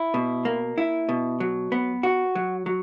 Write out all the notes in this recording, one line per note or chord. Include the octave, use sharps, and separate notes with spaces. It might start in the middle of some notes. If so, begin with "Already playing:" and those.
Already playing: E4
B2
A#3
E4
B2
F#3
B3
F#4
F#3
F#3